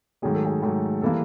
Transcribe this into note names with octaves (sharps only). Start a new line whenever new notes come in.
G#2 D#3 F#3 A3 G#4
A4
G#4
G#2 D#3 F#3 A3
E3 G3 A#3 A4